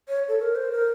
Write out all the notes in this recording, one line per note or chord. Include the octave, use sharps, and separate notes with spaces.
C#5
A4
A#4
C5
A#4